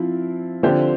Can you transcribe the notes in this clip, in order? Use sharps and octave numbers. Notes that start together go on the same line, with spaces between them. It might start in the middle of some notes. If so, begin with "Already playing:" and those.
Already playing: F3 C4 E4
D3 F3 C4 G4 C5